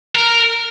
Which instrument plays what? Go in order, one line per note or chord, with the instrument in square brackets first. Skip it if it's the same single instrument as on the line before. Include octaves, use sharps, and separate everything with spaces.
[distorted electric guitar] A#4